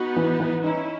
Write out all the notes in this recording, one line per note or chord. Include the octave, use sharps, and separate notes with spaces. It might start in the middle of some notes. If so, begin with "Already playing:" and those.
Already playing: B3 D#4 F#4
E3
E3
C#4 D#4 E4